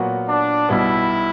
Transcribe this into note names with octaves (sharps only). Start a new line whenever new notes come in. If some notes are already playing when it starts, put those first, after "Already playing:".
Already playing: A#2 F#3 B3 F#4 A#4
D4
B1 B2 G3 B3 E4